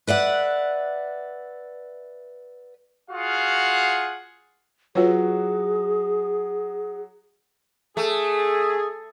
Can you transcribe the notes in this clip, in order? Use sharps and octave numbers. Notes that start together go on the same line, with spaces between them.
B4 D5 E5 F#5
F4 F#4 G#4 F5 F#5
F#3 F4 F#4 G#4 B4 C#5
A3 G#4